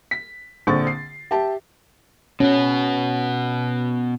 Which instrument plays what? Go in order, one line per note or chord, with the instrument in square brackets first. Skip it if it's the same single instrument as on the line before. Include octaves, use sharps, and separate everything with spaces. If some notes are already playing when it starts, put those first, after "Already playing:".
[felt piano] B6
A#1 D3 C4 C#6 A6
C7
G4 E5 A5
[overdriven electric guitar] B2 B3 [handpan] C#4